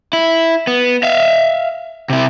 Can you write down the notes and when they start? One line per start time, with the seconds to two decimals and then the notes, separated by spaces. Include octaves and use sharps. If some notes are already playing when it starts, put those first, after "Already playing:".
0.13 E4
0.67 B3
1.03 E5 F5
2.10 C3 E4